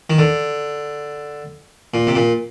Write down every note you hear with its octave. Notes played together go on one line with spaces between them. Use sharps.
D#3
D3
A#2
C3
A#2